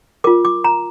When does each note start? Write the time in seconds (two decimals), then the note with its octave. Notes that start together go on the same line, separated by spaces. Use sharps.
0.24 F4 A#4 D6
0.45 D6
0.64 A#5